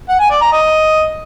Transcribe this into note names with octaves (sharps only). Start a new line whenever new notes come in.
F#5
G#5
D5
A#5
D#5